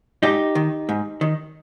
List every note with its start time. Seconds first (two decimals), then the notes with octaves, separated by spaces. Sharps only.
0.23 G#2 D#4 G4
0.55 D#3
0.89 G#2
1.21 D#3